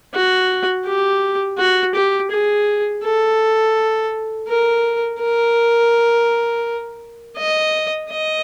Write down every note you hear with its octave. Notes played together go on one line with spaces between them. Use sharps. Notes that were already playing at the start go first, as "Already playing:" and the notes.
F#4
G4
F#4
G4
G#4
A4
A#4
A#4
D#5
D#5